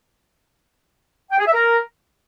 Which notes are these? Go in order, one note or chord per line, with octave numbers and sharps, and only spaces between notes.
G5
G#4
E5
A#4